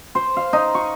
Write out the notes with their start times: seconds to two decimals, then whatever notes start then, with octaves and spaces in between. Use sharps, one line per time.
0.15 C5
0.36 F5
0.53 D#4
0.75 C#6